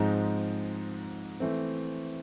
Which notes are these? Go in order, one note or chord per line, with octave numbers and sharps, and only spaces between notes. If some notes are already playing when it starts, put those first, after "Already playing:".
Already playing: G#2 F3 G#3 C4 D#4
E3 A3 C4